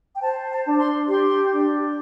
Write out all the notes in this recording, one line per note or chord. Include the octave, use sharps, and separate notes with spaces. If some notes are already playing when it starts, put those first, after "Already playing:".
G5
C5 A5
A5
D4
A5
C6
G4 C6
D4